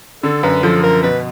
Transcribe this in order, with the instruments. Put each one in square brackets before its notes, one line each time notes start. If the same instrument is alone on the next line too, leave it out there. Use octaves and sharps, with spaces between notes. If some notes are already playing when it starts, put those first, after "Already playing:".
[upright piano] D3 [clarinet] A4
[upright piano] F#2 [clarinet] B4
[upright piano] F3 [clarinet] A4
[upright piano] F#2 [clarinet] A#4
[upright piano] B2 [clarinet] B4